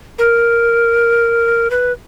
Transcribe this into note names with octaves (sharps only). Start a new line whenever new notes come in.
A#4
B4